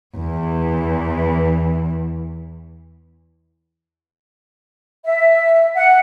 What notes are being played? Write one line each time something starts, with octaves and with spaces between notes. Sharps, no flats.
E2 E3
E5
F#5